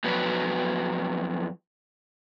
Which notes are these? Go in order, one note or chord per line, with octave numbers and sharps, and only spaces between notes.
F2 F#3 B3 F#4 B4